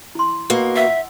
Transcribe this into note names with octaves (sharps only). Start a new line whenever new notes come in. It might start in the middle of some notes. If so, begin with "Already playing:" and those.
E4 C6
B2 A#3
E5 F#5 E6